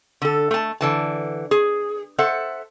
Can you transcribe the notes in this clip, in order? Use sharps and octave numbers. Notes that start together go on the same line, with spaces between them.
D3 A4
A3 A5
D3 E3 A5
G#4
A4 C5 E5 F#5